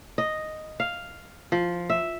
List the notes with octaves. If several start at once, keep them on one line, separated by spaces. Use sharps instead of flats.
D#5
F5
F3
E5